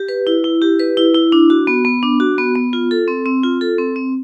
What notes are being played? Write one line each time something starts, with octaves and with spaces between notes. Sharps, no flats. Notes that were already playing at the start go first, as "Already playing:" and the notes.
Already playing: G4
B4
E4
E4
G4
B4
E4
E4
D4
F#4
B3
B3
D4
F#4
B3
B3
F4
A4
C4
C4
F4
A4
C4
C4